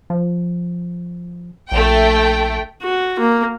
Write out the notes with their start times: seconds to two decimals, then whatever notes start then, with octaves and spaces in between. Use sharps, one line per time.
0.10 F3
1.72 A#1 A3 G5
2.82 F#4
3.20 A#3